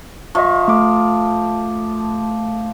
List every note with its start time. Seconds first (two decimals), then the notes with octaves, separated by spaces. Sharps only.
0.35 F3 D#5 E5 C#6
0.68 A3 D6